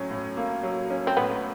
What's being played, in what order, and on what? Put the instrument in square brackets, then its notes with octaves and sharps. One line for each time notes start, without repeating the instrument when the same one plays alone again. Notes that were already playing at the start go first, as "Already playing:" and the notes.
Already playing: [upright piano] A2 F#3 C#4
A2
A#3
F#3
C#4
[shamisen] C4
[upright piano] A2 [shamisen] B3